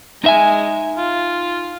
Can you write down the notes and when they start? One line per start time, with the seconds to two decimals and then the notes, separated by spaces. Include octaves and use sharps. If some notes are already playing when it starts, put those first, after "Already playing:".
0.24 G#3 D#4 E5 G#5
0.97 F4